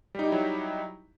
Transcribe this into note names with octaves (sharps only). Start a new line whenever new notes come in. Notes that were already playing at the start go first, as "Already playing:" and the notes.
F#3 G3 D#4 E4 G4